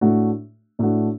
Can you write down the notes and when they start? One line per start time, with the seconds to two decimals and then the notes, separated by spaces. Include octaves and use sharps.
0.01 A2 A3 D4 F#4
0.79 A2 A3 D4 F#4